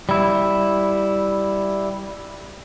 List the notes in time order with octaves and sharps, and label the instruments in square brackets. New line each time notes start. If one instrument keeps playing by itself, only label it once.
[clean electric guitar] G3 E4